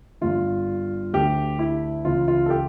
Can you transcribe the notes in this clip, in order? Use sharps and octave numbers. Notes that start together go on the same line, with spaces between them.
G1 G2 D3 F4
D2 D3 G4
E4
C#2 C#3 E3 F4
F4
A4
G4